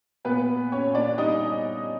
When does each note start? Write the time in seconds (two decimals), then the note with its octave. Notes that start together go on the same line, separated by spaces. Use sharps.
0.25 A#2 B3 B4
0.56 A#2
0.72 C#4 C#5
0.87 A#2
0.95 D4 D5
1.18 G3 D#4 D#5